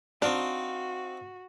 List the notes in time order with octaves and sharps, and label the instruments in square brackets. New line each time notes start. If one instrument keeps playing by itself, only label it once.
[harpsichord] C4 D#4 F5 [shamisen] D4 [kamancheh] F#4